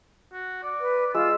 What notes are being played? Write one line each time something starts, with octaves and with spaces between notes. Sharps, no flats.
F#4
D5
B4
G#3 F4 E6